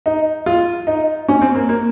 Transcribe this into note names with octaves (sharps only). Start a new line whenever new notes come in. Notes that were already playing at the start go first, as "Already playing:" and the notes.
D#4
F4
D#4
C#4
C4
A#3
A#3